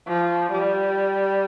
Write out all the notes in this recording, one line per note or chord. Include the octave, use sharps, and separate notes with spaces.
F3
G3